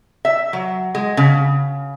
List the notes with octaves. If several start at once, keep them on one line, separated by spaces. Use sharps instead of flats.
E5
F#3
G#3
C#3